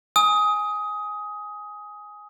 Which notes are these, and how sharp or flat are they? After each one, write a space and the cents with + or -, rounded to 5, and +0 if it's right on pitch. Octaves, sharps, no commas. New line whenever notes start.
G#5 +0 D#6 +15